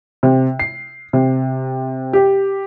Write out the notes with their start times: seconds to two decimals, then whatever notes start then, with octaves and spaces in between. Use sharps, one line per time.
0.23 C3
0.59 C7
1.13 C3
2.13 G4